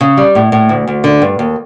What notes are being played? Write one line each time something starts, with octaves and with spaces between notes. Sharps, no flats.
C#3
G3
A2
A2
D2
D2
D3
G2
D#2